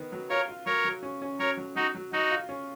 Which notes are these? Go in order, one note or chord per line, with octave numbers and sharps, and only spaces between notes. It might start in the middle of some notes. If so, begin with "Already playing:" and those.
Already playing: D#3 B3
F#3
F4 A#4 C#5
F4
F#3 A#4 C#5
F#3
C#4
C#4
F#3 A#4 C#5
F#3
F#3 D#4 F#4
F#3
F#3 D#4 F#4
F4
C#4